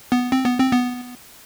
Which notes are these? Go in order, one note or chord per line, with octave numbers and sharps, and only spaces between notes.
B3
C4
B3
C4
B3